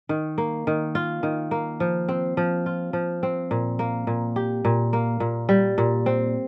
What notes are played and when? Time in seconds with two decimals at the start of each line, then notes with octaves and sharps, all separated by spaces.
0.09 D#3
0.38 A#3
0.67 D#3
0.95 F4
1.23 D#3
1.51 A#3
1.80 F3
2.09 C4
2.37 F3
2.66 F4
2.93 F3
3.23 C4
3.51 A#2
3.79 A#3
4.07 A#2
4.36 G4
4.65 A#2
4.93 A#3
5.20 A#2
5.49 G3
5.78 A#2
6.06 C4